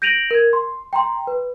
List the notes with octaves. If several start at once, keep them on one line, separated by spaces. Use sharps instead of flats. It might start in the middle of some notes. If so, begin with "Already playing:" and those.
G6 A#6 D7 D#7 F7 F#7
A#4 G#6
C6
G5 A#5 C6
B4